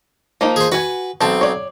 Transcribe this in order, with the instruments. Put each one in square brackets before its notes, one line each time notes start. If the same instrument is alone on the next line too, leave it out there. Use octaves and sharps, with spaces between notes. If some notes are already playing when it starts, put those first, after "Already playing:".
[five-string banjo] F3 A#3 D#4
[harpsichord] G#4 C5
[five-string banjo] F#4 G#5 [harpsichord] B4
[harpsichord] B1 C4 [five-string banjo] A5
[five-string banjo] C#5 D5